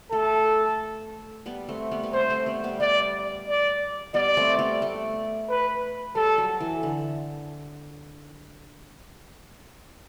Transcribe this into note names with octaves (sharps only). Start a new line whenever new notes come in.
A3 A4
G3 B3
A3 C4
G3 B3
B3
A3 C4 C5
A3 C4
G3 B3
G3 B3
G3 B3 D5
D5
G3 B3 D5
A3 C4
G3 B3
A3
B4
G3 A4
F#3
E3
D3